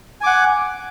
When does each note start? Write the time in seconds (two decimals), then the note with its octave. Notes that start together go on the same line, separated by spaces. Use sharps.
0.21 G#5
0.24 D6
0.26 F#5